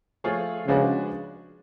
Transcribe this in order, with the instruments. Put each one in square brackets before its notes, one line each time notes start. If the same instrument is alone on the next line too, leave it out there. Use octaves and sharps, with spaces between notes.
[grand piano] F3 A3 F4 G#4 C#5
[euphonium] C#3 [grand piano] F3 G#3 D4 F#4 B4